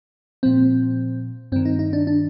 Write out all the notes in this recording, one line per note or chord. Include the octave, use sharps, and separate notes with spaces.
A#2 F3 C4
G2 D#3 C4
D#4
D#4
D4
D4